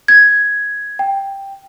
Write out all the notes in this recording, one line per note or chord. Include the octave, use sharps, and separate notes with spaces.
G#6
G5